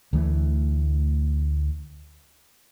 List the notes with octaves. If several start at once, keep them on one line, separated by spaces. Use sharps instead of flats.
D2 E3 A3